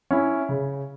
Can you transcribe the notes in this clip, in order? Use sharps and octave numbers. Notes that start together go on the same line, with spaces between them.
C#4 E4
C#3